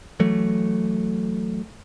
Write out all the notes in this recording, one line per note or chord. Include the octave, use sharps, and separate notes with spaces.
E3 F#3 A3